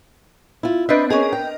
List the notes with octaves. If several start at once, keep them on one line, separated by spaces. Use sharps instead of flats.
E4 F4
B3 C4 D4 B4 D#5 E5
C#4 G#4 A#4 D#5
G5